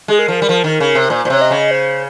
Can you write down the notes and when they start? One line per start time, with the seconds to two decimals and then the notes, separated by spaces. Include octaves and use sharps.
0.08 G#3 G#4
0.19 A#4
0.28 F3
0.42 G3
0.49 F3
0.64 D#3
0.80 C#3
0.95 C3
1.10 A#2 C5
1.25 A#2 C5
1.30 C3 C#5
1.41 D#5
1.51 C#3
1.71 C5